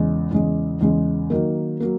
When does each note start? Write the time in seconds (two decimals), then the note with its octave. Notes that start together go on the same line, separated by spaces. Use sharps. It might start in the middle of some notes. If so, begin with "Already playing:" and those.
Already playing: E2 C#3 G#3
0.31 E2 C#3 G#3
0.81 E2 C#3 G#3
1.30 D#3 F#3 A#3
1.80 F#3 A#3